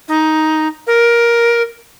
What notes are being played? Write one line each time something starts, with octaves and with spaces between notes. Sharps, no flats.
D#4
A#4